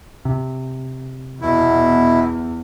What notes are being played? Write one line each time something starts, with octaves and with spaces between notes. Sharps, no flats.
C3
E2 B2 E4